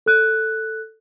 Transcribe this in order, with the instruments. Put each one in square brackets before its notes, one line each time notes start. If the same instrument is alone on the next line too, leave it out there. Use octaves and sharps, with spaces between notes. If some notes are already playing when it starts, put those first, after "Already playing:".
[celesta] A4 F#6